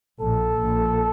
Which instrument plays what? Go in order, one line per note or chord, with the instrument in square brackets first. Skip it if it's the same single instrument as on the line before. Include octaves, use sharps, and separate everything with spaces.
[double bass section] A#1 A#2 [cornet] A4
[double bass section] A#1 A#2